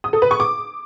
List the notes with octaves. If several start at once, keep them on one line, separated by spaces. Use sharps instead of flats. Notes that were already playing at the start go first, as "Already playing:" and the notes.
D#6
A4
B4
C#6
D6